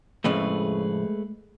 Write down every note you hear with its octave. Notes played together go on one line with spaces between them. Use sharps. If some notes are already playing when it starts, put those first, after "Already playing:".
F2 A2 C#3 G#3 A3 G#4 B4